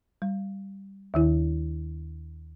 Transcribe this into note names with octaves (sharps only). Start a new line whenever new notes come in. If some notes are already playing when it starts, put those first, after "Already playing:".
G3
D#2 D#3 E4